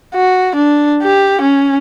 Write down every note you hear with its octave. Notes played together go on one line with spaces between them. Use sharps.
F#4
D4
G4
C#4